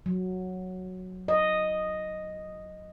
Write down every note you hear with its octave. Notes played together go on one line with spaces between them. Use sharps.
F#3
D#5